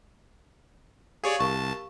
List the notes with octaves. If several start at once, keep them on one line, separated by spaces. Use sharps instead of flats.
G4 G#4 C#5 D5 F5
C2 A#4 A5 C#6